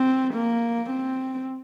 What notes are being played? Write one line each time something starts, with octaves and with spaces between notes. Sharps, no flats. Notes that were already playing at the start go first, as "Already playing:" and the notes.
Already playing: C4
A#3
C4